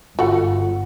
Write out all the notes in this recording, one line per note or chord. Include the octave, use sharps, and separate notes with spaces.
G1 F4 F#4 A4 F#5